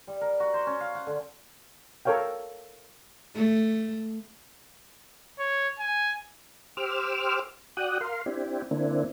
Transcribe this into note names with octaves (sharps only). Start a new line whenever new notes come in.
G3
A#4
F#4
C5
C#4
F5
F#5
D3
A4 A#4 C#5 F5 G5
A3
C#5
G#5
G4 C5 D6 E6 F6
F#4 D5 F#5 G5 D#6 F#6
A#4 F5 C6
C4 D4 E4 G4
D3 A#3 C4 D4 E4